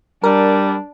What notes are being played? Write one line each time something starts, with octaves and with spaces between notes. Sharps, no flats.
G3 D4 A#4